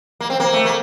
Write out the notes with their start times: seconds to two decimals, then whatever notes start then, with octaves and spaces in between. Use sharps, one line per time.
0.20 A#3
0.30 C4
0.40 A#3
0.53 A3
0.65 A#3